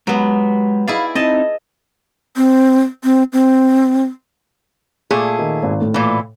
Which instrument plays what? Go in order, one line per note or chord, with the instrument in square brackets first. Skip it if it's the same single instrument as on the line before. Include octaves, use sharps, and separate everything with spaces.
[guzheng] F#3 B3 [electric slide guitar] G#3 G4
[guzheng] E4 G#4 D5 [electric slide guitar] F5
[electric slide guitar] C4 D#4 E4 [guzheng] D#5 A5
[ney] C4
C4
C4
[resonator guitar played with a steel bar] A#2 A3 G#4
[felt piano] D#3
G#1
A2
[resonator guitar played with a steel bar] A#2 E3